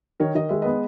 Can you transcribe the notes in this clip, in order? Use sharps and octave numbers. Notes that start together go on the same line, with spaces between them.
D#3 A#4 C#5
D#3 D#5
G#3 E5
B3 B4 D#5